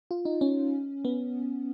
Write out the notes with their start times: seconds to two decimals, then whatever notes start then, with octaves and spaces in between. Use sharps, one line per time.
0.11 F4
0.25 D#4
0.41 C#4
1.05 B3